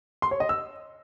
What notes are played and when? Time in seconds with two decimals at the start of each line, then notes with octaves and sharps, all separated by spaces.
0.22 C6
0.31 C#5
0.40 D#5
0.49 E6